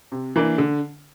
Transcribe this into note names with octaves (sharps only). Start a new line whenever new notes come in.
C3
E3 A#3 D4
D3